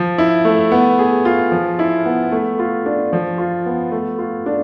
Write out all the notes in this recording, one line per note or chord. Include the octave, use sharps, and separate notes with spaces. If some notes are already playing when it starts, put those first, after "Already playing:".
Already playing: F3
E4
A3
B3
G#4
F4
F3
E4
B3
A3
F4
D4
F3
F4
B3
A3
F4
D4